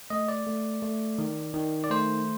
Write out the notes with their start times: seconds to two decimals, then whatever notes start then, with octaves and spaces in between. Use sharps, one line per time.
0.10 A3 D#5
0.28 D5
0.47 A3
0.82 A3
1.18 D#3
1.54 D#3
1.84 D5
1.90 A3 C5